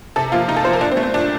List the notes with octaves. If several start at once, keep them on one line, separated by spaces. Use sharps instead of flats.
C3 A4
F3 A#3 F4
C3 D#4
A4
F3 A#3 C5
A#4
A#2 D4
C4
A3
C4
A#2 D4